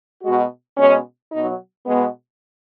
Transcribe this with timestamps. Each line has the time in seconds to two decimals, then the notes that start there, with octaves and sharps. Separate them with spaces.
0.23 B2 G#3 F#4
0.77 B2 G#3 C#4
1.32 B2 F#3 D#4
1.86 B2 G#3 B3